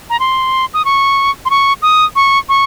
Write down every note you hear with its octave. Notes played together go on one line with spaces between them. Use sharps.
A#5
C6
D#6
C#6
C6
C#6
D#6
C#6
C#6